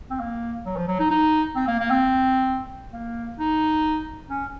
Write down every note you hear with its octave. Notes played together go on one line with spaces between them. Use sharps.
C4
A#3
F#3
F3
F#3
D#4
D#4
C4
A#3
A#3
C4
A#3
D#4
C#4